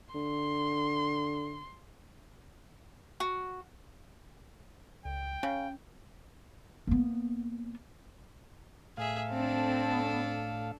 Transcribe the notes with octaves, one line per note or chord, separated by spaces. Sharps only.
D3 C6
F#4
C#2 G5
C#3 C#4
A#3 B3
A2 G#4 E5 F5
C4 D4 A4